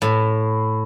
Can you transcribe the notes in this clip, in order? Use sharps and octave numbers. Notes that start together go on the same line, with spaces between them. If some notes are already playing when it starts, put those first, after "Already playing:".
A2